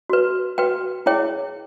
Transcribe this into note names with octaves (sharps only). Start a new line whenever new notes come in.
F#4 B4
F#4 B4 G5
E4 G#4 C#5 G5